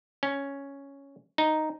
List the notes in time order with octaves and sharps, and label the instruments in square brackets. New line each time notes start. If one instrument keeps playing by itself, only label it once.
[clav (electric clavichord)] C#4
D#4